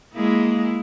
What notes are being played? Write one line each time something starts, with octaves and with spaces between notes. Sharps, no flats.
G#3 A#3 E4